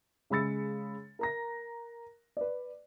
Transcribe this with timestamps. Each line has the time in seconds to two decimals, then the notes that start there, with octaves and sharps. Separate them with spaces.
0.30 C#3 G#3 B5 E6 A6 C#7
1.19 A#4 A#5 A#6
2.37 B4 D5